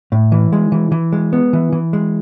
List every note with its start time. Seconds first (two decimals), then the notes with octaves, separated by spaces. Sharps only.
0.12 A2
0.32 E3
0.53 G#3
0.72 E3
0.92 E3
1.12 G#3
1.33 B3
1.53 E3
1.72 E3
1.93 G#3